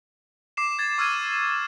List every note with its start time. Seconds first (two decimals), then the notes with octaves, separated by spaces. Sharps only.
0.57 D6 C7 E7
0.79 G#6 A6
0.98 C#6 E6 F6 G#6 D#7